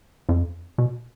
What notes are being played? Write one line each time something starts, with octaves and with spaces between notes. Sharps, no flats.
F2
B2